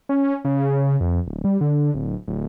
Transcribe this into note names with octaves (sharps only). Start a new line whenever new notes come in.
C#4
C#3
F2
D1
G3
D3
D1
D1